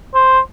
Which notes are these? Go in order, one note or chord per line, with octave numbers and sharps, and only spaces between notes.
C5